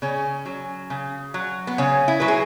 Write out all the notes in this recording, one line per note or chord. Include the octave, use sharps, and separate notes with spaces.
C#3 C#4
F#3
C#3
F#3
B3
C#3 C#4
E4
F#3 B4
G#4